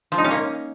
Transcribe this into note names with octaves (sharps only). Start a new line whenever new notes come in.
F3
D#4
C#4
A#3